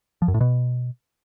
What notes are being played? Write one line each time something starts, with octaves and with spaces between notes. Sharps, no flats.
F3
F#2
A2
B2